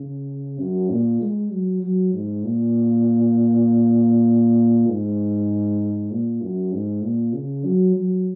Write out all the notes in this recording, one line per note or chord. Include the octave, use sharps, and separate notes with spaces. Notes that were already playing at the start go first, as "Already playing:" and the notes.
Already playing: C#3
F#2
A#2
G#3
F#3
F#3
G#2
A#2
G#2
A#2
F#2
G#2
A#2
C#3
F#3
F#3